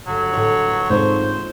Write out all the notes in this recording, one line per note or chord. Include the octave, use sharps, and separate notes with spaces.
G1 F#3
A1 A2 C#5
G#2 A3 A#3 C4 F4 C5